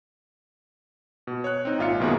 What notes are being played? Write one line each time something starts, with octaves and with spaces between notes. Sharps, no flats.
B2
C#5 F#6
C4 D#4
G#1 A#2 F4 E5 F6 C#7
F#2 B2 D#3 A#3 B3 G#4